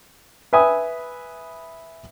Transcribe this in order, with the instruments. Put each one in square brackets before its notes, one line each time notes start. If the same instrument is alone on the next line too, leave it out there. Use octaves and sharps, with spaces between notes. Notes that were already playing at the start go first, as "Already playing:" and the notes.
[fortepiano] B4 E5 G#5 B5 D#6